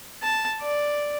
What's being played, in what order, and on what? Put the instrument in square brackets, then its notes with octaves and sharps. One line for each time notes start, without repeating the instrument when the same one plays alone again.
[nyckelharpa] A5
D5